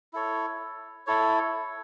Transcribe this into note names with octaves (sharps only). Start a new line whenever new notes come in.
E4 A4 C#5
E4 A4 C#5